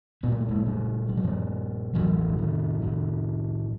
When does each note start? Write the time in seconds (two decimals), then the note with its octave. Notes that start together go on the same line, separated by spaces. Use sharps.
0.23 A#2 B3
0.32 A#3
0.41 A3
0.48 G#3 A#3
0.66 G3 A3
1.09 G3
1.17 F#3
1.24 F3 G3
1.95 A2 E3 F#3
2.18 G3
2.29 F#3
2.38 D#3 F3
2.82 D#3 F3